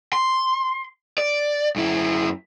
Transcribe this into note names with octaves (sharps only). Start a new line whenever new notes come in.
C6
D5
F#2 E4